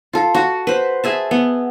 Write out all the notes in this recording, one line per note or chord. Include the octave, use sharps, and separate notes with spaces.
F4 A4
F#4
B4 C5
G#4 E5 A5
B3